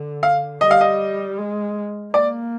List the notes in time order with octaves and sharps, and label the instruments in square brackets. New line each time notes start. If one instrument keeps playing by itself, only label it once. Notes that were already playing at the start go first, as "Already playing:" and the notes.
Already playing: [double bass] D3
[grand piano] F5
[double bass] G3 [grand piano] D#5
[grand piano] F5
D#5
[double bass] G#3
[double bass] A#3 [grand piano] D5